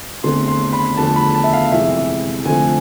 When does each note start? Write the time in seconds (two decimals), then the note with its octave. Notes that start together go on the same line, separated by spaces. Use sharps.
0.23 E2 D3 A3 C4 C6
0.48 C6
0.73 B5
0.97 E2 D3 F3 A3 A5
1.16 B5
1.35 A5
1.44 E5
1.53 F5
1.72 F2 C3 E3 G#3 E5
2.45 D3 F3 A3 C4 G#5